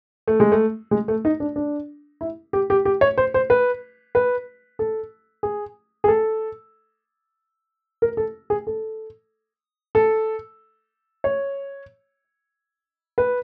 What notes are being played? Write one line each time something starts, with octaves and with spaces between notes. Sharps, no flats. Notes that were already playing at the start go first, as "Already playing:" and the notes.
A3
G#3
A3
G#3
A3
D#4
D4
D4
E4
G4
G4
G4
C#5
C5
C5
B4
B4
A4
G#4
G#4
A4
A#4
A4
G#4
A4
A4
C#5
B4